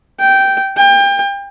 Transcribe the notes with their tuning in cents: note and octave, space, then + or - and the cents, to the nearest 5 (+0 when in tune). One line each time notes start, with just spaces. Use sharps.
G5 -10
G5 +30